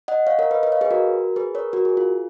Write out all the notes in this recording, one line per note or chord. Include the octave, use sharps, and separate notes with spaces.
D#5 F#5
C#5 F5
A#4 C#5
B4 D#5
B4 D#5
C#5 F5
G#4 B4
F#4 A#4
G#4 B4
A#4 C#5
F#4 A#4
G#4
F4